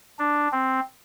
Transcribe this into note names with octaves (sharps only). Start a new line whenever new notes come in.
D4
C4